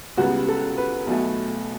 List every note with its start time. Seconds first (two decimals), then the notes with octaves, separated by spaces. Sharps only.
0.17 C#2 C#3 G3 B3 F#4
0.48 A4
0.77 B4
1.07 B1 B2 A3